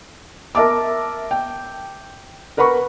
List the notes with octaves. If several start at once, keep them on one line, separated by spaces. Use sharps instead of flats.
A#4 E5 A5 D6
G5
A#4 B4 F#5 B5 C#6